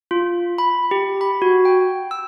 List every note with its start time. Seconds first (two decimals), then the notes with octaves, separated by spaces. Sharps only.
0.11 F4
0.58 B5
0.91 G4
1.21 B5
1.42 F#4
1.65 G5
2.11 E6